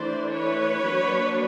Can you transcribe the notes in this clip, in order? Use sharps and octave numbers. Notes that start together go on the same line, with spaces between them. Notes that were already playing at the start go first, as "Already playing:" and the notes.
Already playing: E3 A3 D4 C5 D5
B4 C#5
F#3 A#3 D4